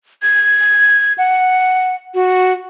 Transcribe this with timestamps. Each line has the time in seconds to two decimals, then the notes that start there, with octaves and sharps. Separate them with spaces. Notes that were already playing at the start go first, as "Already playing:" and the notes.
0.22 G#6
1.18 F#5
2.14 F#4